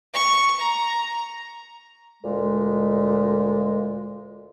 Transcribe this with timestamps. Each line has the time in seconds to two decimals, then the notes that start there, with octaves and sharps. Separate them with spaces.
0.14 C#6
0.60 A#5
2.23 D2 A#2 G#3